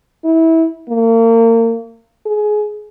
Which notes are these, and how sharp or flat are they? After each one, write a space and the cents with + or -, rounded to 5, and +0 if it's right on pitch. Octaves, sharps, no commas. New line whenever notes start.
E4 -20
A#3 -35
G#4 +20